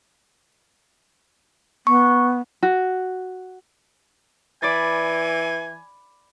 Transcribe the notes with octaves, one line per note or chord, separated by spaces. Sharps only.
B3 C#6
F#4
E3 D5 G#5 B5 A6